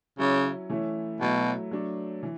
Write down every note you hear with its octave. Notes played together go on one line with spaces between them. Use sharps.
C#3 F#3 C#4 E4
E3 A3 C#4 E4
B2 F#3 A3 E4
F#3 A3 D4
E3